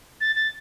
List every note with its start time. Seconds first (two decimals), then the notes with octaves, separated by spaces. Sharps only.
0.21 A6
0.36 A6